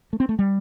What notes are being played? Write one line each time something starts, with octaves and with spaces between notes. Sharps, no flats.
A3
C4
A3
G3